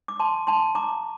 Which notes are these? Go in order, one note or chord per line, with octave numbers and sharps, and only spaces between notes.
D6
A5 C6
A5 C6
A#5 D6